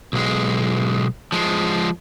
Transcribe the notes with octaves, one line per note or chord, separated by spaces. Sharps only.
B1 G#3
F3 G#3